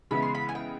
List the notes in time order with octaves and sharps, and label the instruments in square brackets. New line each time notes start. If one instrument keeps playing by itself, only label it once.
[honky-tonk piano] C#3 E3 G#3 B3 E4 [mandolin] B5
[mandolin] C6
B5
G#5
G5